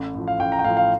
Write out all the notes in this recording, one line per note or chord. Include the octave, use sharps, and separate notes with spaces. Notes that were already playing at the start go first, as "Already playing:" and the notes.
Already playing: A1
A2 F3
F5
A1 G5
A#5
G5
A2 F3 F5
F5